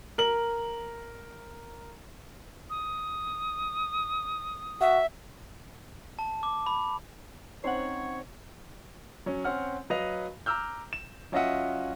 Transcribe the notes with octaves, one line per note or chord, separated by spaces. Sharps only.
A#4 F#7
D#6
F#4 E5
A5
D6
B5
C4 C#4 D#4 C5 C#5 F#5
F#3 C#4
C4 C#4 F#5 F6
F#3 B4 D#5 F5 F7
A#5 D6 E6 F6 G6
E7
F#3 C#4 F4 D#5 E5 F#5